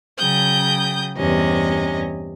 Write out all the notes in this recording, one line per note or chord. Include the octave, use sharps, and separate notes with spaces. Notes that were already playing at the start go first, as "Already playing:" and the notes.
C#3 F#3 G5 D#6 G6
E2 G2 C3 C#4 D#5